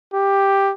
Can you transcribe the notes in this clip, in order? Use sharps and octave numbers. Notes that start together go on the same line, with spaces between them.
G4